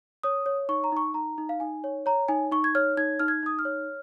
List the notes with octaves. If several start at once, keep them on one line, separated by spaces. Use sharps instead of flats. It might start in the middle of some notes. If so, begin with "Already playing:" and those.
C#5 D#6
C#5
D#4 C#6
A#5
D#4 C#6
D#4 A#5
D#4
F5
D#4 G#5
C#5
C#5 A#5
D#4 G#5
D#4 C#6
G#6
C#5 F6
D#4 G#6
D#4 F6
G#6
D#4 D#6
F6
C#5